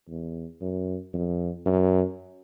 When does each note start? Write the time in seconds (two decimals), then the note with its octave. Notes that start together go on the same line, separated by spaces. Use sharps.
0.09 E2
0.61 F#2
1.13 F2
1.66 F#2